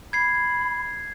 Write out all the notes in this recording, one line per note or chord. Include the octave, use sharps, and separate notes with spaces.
B5 G#6 C7